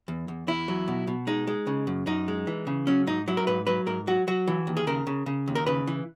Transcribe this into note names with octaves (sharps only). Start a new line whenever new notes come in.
E2
E2
E2 E4
F#3
B2
B2
G#3 D#4
G#3
C#3
F#2
F#2 D#4
G#3
E3
C#3
F#3 C#4
G#2 D#4
F#3 E4
A#4
G#2 B4
F#3 B4
G#2 A#4
F#3 F#4
F#3 F#4
E3
D#2
G#4
C#3 A#4
C#3
C#3
D#2
A#4
C#3 B4
E3